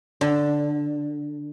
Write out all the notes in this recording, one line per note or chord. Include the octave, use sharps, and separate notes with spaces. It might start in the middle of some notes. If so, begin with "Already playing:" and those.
D3